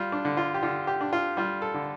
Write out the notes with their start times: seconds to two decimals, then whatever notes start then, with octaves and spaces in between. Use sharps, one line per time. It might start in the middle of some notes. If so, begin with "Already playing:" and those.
Already playing: G3 F4
0.12 D4
0.25 D3
0.37 F4
0.54 G4
0.63 D3 F4
0.87 G4
1.01 D4
1.13 F4
1.37 G3 F4
1.62 A4
1.74 D3